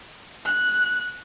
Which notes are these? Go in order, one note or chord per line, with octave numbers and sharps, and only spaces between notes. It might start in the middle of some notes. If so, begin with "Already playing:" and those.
F#6